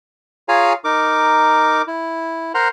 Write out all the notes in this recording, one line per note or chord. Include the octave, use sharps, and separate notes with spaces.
F4 G#4 C#5 F5 G#5 A#5
D#4 A#4 D6
E4
A#4 C5 F#5 A#5 C6